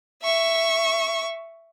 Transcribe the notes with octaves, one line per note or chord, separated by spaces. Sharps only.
E5 C#6